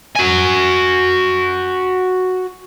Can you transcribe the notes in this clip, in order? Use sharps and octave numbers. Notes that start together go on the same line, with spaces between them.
F#4 G#5